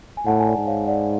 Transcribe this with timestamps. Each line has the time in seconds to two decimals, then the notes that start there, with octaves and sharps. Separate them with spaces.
0.17 G#5
0.26 A2 F#5 A5
0.40 G#5
0.47 D5 F#5
0.57 G#2
0.67 C#5 F5
0.87 D5 F#5